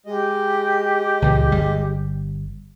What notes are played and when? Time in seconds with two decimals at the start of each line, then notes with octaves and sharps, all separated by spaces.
0.06 G#3 G4 D#5
1.22 C#2 A#2 E3
1.52 G1 G3